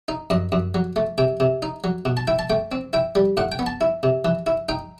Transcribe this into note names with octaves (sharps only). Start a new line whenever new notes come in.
D#4
F#2 D#5
F#2
F#3
A3
C3 G5
C3
D#4
F#3
B2
A5
E4 G5
A5
A3 G5
C4
E4 G5
G3
A2 F#5
G5
B3
A5
E4
C3
E3
E4
D#4 G5